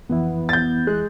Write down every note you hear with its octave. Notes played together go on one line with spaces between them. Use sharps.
F2 E3 B3 E4
G6 A6
G#3 F#6